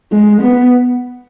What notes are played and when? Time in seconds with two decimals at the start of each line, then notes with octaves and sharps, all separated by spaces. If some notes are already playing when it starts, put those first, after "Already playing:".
0.12 G#3
0.42 B3